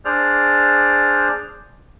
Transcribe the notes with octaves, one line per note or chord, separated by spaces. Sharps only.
D4 G#4 C5 D5 F6